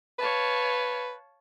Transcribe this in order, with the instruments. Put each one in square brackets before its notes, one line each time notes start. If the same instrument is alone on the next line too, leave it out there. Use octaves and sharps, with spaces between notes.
[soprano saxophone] B4 [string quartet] C#5 F5 A5